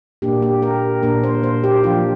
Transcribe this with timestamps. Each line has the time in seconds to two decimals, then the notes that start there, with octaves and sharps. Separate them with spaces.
0.22 A#2 A#3 D4 G4
0.42 G4
0.62 A#4
1.03 A#2 A#3 D4 A#4
1.23 C5
1.43 C5
1.64 G4
1.84 F3 D4 F4